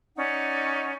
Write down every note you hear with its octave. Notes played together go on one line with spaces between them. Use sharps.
C#4 D#4 D5 F#5